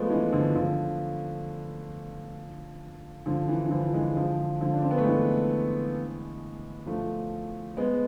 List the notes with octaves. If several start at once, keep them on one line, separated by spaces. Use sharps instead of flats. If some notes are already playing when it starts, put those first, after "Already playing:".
Already playing: F3 G#3 A3 B3
E3 G#3
D3 F3
D3 F3
D3 F3
E3
E3
D3 F3
E3 G#3
D3 F3
D3 F3
D4
C4
B3
A3
E3 G#3
F3 A3
G#3 B3